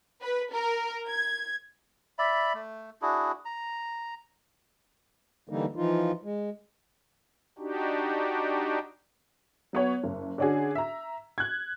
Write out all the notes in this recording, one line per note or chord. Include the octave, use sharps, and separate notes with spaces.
B4
A#4
G#6
D5 E5 B5
A3
D4 E4 F#4 G#4
A#5
D3 E3 G3 A#3 D#4
E3 F3 D#4 F4
G#3
D4 D#4 F#4 G4
F#3 B3 C#5
F#1
D3 C#4 D4 F#4 G#4
E5 A#5
F#6 G#6